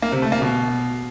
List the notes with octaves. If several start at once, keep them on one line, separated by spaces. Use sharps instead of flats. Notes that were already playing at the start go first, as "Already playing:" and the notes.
A#3
C3
A3
A#3
B2